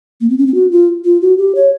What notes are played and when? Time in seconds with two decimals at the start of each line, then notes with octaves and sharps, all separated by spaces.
0.21 A#3
0.30 C4
0.38 C#4
0.47 C4
0.54 F#4
0.71 F4
1.05 F4
1.22 F#4
1.38 G4
1.55 C#5